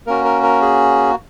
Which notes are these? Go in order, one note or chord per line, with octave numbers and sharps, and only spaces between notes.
A#3 C#4 F#4 A#4
A#4
A#4
G#4